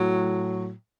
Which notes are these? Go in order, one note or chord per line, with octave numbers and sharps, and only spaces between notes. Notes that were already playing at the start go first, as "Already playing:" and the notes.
Already playing: A2 F#3